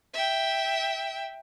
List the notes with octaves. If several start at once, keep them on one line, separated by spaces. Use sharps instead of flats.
E5 G5